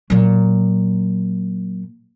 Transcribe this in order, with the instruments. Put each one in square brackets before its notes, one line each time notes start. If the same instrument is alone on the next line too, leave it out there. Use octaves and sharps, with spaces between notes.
[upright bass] A#2 F#3